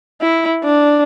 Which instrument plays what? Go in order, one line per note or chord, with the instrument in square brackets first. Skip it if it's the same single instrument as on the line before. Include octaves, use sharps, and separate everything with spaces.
[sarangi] E4
D4